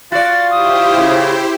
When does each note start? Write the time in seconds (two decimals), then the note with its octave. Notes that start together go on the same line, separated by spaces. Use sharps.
0.12 F4 F#4 D5 A6
0.51 E4 G4 C5 D#6
0.94 A2 C#3